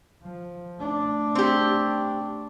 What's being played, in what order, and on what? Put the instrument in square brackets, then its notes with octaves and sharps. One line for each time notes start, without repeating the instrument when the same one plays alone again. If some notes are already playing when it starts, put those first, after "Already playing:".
[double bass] F3
A3 D4
[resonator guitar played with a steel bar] C4 G4